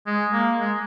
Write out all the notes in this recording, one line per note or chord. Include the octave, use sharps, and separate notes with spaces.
G#3
A#3
G#3